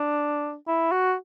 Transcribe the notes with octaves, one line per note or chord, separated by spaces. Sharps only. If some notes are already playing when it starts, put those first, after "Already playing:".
Already playing: D4
E4
F#4